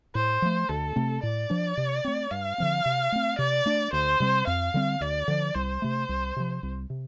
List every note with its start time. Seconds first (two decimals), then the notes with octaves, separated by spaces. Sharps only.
0.15 A2 C5
0.42 F3 A3
0.69 D2 A4
0.96 C3 A3 C4
1.23 A2 D5
1.50 F3 D4
1.77 C3
2.04 A3 C4
2.31 G2 F5
2.58 D3 F3 C4
2.86 C3
3.12 A3 C4
3.39 C3 D5
3.66 A3 D4
3.93 D2 C5
4.20 C3 G3 C4
4.47 F2 F5
4.74 D3 G3 C4
5.01 D2 D5
5.28 D3 F3
5.55 C2 C5
5.82 C3 A3
6.09 C2
6.36 C3 F3
6.63 C2
6.90 C3